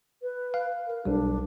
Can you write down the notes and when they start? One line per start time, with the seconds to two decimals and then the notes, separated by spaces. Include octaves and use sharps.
0.22 B4
0.54 F5
0.87 A#4
1.05 B1 G3 D4